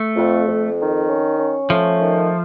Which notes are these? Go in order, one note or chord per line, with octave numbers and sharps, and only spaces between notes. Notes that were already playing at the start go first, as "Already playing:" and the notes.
Already playing: A3
F2
F2
D#3
C#4
C#4
F3 A3
D#3